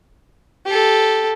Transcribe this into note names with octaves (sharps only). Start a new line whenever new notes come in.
G4 A4